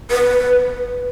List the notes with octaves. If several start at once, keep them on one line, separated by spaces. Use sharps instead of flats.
B4